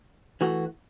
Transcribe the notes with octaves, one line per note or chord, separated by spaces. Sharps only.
E3 A3 F#4